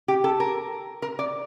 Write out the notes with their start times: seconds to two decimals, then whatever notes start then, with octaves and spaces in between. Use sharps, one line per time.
0.08 G4
0.24 A4
0.40 A#4
1.02 A#4
1.19 D5